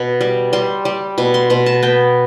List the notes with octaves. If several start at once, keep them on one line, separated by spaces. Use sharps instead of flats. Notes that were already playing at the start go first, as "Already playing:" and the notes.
Already playing: B2 B5
G3
G3 C6
G3
B2 B5
C6
B2 B5
A5
B3 G5